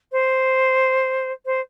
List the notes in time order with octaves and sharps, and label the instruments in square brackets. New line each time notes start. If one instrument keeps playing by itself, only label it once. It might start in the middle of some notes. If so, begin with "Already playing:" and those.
[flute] C5
C5